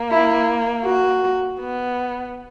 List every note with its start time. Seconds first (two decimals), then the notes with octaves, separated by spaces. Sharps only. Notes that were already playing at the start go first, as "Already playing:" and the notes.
Already playing: A#3
0.11 E4
0.85 F#4
1.60 B3